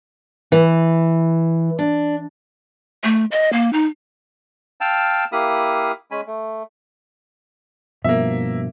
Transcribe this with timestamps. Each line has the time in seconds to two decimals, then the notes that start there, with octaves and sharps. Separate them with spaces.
0.52 E3
1.79 D4
3.04 A3
3.32 D#5
3.53 A#3
3.73 D#4
4.81 F5 G5 A5 E6 F6
5.32 A#3 E4 G4 F5 B5 D#6
6.11 G#3 C#4 G#5 B5
6.27 A3
8.04 G2 B2 F3 A#3 E5